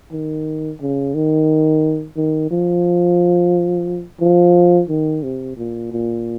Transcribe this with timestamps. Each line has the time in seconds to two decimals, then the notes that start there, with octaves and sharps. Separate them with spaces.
0.12 D#3
0.81 C#3
1.14 D#3
2.17 D#3
2.51 F3
4.21 F3
4.89 D#3
5.23 C3
5.57 A#2
5.92 A#2